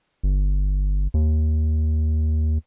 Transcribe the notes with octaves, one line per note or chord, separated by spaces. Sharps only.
G1
D#2